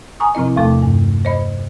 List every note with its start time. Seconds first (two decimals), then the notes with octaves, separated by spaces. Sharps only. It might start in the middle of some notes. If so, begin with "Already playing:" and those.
0.20 G#5 A#5 C#6 D#6
0.35 C3 F3 C4 E4 D#5
0.56 E2 C3 A3 A4 A5 D6
0.82 G2
1.25 C5 D#5 B5